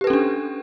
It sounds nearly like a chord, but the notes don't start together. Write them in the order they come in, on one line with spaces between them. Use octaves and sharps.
G4 B4 A4 C#4 D4